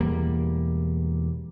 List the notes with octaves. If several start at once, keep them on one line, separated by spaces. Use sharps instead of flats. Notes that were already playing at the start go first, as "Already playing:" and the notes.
E1 E2 G3 A#3